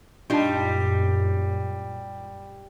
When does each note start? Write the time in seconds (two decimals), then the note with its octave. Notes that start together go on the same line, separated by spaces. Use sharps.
0.30 F#2 A#2 G3 D4 D#4 F4 A5